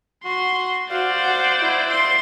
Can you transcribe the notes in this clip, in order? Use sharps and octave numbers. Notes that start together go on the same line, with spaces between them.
F#4 C6
F#4 C5 D5 F5
F#5
E4
C6